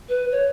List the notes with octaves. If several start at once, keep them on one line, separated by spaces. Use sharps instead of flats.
B4
C#5